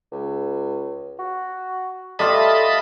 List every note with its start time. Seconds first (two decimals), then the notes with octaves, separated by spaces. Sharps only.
0.12 C#2
1.19 F#4
2.19 G3 A3 F4 D#5 E5 A5 B5